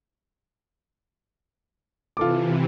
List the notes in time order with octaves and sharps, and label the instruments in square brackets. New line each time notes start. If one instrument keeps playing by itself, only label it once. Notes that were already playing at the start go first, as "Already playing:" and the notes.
[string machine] C3 E3 [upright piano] F4 A4 D6